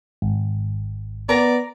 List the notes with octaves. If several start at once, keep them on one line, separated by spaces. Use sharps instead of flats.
G#1
B3 A#4 D5 A#5